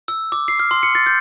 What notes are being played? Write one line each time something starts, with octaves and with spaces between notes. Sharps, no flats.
E6
D6
C7
F6
C6
C#7
A6
G6